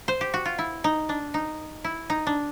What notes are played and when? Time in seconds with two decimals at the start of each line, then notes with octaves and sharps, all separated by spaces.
0.08 C5
0.21 G4
0.34 F#4
0.45 F4
0.59 E4
0.84 D#4
1.09 D4
1.34 D#4
1.84 E4
2.10 D#4
2.27 D4